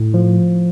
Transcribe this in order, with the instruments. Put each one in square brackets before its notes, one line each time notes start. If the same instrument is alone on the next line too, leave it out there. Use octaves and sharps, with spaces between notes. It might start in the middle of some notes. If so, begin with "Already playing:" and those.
Already playing: [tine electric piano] A2
F3